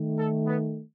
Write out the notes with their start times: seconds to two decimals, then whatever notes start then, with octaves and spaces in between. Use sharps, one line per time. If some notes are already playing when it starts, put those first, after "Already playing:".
Already playing: D#3 A3
0.19 A4
0.47 B3